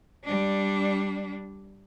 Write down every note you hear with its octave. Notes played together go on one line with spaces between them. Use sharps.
G3 D4